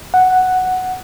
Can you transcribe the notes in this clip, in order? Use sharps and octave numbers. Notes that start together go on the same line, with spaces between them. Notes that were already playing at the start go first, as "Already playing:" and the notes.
F#5